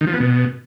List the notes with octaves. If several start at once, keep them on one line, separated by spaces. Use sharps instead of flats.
D#3
F3
B3
B2